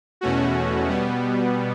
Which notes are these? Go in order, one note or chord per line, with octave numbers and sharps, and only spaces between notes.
E2 B2 A3 C#4 F#4
B2 G3 B3